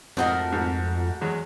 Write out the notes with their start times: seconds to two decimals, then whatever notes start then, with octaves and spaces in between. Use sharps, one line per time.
0.17 F2 G#2 A3 C4 F#4 A#4 D#5
0.52 G#2
1.21 E2 F#3 G#3